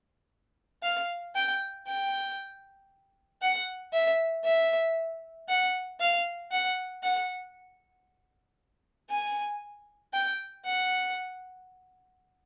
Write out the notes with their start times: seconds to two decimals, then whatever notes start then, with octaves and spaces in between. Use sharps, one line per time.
0.83 F5
1.35 G5
1.87 G5
3.42 F#5
3.93 E5
4.44 E5
5.49 F#5
6.00 F5
6.52 F#5
7.03 F#5
9.10 G#5
10.13 G5
10.65 F#5